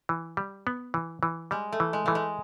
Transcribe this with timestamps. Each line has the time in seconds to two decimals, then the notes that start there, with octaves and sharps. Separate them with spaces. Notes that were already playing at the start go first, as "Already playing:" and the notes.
0.09 E3
0.37 G3
0.67 B3
0.94 E3
1.23 E3
1.51 G3 G#3
1.72 A3
1.80 E3
1.93 G#3
2.06 E3 A3
2.15 G#3